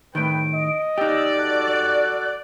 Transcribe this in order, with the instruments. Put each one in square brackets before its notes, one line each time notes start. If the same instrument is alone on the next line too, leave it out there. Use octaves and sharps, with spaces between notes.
[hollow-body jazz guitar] A2 D#3 [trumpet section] B4 G5 [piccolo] D7
[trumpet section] D#5
[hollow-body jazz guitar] D#4 G4 [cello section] D5 [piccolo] E6
[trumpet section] F#4 A4 [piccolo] F#6